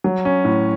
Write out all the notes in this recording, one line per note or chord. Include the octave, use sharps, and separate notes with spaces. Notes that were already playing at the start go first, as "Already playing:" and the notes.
F#3
C#4
A2